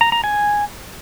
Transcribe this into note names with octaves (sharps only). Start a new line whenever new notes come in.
A#5
A#5
G#5